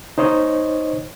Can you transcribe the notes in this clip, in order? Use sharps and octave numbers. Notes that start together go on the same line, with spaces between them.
D#4 C5 C#5 D#5